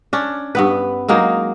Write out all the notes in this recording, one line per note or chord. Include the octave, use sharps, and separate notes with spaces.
C#4 D4
G2 B3 B4
F#3 G#3 A#3 D#4